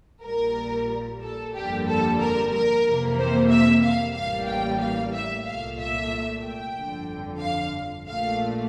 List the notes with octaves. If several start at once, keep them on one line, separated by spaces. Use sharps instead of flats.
A#1 A#2 G3 A#4
A4
G1 F2 D3 G3 A#3 G4
A4
A#4
A#4
F2 C3 E3 A#3
C5
E5
F5
A1 A2 E3 G3 A#3 F5
G5
F5
E5
C2 A#2 A3 F5
E5
G5
G1 F2 D3
F5
A#1 A#2 A3 F5